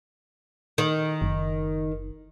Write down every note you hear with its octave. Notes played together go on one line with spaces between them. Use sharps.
D#3
F#1